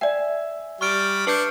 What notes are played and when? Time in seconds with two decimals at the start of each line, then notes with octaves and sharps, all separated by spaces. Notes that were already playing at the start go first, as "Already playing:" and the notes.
0.01 D5 E5 G5 G#5
0.81 G3 C#6 F6 D7
1.27 D4 B4 F6 G6 C7 C#7